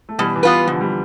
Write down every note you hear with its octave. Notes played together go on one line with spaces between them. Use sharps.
A3
B2 E3 G3
E3
B3 F4 B4
B2 D3 F3
G3